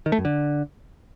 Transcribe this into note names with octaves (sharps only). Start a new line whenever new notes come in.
D#3
A3
F#2
D3